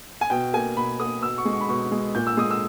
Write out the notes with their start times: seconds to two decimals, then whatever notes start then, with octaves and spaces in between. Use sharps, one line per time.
0.21 G#5
0.30 B2 G5
0.54 A#3 G#5
0.77 B2 B5
1.00 A#3 D#6
1.22 B2 E6
1.38 C#6
1.45 G#3
1.53 C#6
1.61 B5
1.68 B2 C#6
1.92 G#3
2.15 A#2 G6
2.27 E6
2.37 G#3 D#6
2.51 E6